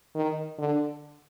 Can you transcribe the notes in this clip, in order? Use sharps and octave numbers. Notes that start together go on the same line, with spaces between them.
D#3
D3